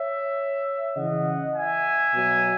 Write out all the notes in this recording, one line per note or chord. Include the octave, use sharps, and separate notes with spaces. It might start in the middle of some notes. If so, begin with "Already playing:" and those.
Already playing: C#5 E5
C#3 E3 D#5 F#5
E5 G#5
B2 F#3